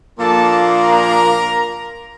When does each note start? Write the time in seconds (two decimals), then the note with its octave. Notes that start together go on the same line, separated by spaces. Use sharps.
0.19 A#2 F3 A#3 D4 A4 A5
0.80 A#4 A#5